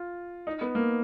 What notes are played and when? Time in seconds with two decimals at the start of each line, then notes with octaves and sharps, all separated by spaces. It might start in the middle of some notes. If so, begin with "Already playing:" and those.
Already playing: F4
0.47 D#4
0.61 B3
0.75 A#3